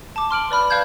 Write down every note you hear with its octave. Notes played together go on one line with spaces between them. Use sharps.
A5 D6
C6 F6 D7 F#7
B4 D5 B5 F6
B4 D5 F5 A5 G6 G#6